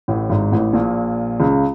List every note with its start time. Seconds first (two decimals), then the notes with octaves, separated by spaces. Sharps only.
0.08 A1 A2
0.30 G#1 G#2
0.52 A1 A2
0.73 A#1 A#2
1.40 C#2 C#3